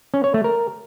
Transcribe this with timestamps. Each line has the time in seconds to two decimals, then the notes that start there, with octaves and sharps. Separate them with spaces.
0.14 C#4
0.24 C#5
0.34 A3
0.44 A#4